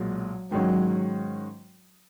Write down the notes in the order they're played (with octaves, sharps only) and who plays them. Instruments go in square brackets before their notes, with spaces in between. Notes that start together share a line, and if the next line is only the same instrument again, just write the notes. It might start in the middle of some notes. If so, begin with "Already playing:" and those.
Already playing: [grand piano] B1 A#2 G#3 [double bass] F#3
[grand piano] G#2 D#3 G#3 C#4 F#4 [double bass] F#3